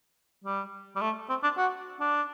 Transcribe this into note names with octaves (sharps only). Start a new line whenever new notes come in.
G3
G3
A3
C4
D4
F#4
D4